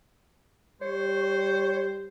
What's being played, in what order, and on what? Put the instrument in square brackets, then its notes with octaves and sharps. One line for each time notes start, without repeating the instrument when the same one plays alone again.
[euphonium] G3 [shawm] C5 [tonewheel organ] C#5